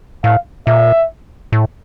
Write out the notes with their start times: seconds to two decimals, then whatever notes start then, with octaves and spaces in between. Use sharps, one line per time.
0.24 A2 F5
0.67 A#2 E5
1.52 A2